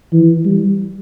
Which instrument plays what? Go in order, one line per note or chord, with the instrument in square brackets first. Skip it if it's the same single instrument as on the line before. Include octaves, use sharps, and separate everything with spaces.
[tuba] E3
G3